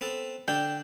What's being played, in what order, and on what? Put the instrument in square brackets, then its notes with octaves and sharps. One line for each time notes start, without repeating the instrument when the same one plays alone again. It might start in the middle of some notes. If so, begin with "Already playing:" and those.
[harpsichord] B3 C4 A4
[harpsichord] D3 D4 A4 [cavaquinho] G5